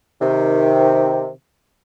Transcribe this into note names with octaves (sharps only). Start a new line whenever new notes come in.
C3 D#3